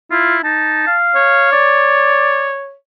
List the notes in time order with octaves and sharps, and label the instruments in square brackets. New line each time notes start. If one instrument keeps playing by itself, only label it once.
[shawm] E4 [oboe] F4
[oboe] D#4 [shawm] A5
[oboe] F5
[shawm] C#5
[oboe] D5